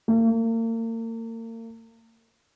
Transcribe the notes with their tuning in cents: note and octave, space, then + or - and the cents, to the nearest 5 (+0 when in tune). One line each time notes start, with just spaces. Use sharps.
A#3 -40